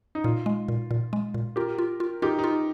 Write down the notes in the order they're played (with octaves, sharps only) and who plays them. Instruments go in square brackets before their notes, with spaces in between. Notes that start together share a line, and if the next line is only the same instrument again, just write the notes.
[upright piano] D#4
[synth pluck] A#2 [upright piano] F4
[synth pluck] G#3
A#2
A#2
G#3
A#2
[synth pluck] F4 [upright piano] G4 A#4
[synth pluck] F4
F4
[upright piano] D#4 G4 [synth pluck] F4
[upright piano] D#4
[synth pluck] F4